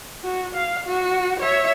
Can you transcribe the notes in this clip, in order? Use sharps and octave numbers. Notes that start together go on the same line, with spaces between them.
F#4
F5
F#4
C#5 E5